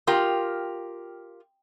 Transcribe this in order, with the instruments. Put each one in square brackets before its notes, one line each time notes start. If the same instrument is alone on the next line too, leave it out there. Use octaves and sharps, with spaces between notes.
[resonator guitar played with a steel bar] F4 G4 A#4 [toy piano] G5 C6 D#6